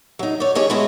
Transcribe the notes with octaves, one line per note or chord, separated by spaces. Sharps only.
F#3 D#4
C#5 D5
D#4 G4 G#4 C#5
G#3 A3 B3 E4 F#4 D#5